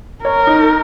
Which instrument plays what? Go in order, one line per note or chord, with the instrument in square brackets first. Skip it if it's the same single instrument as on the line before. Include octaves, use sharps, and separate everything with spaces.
[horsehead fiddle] A#4 [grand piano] C#5
[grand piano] D#4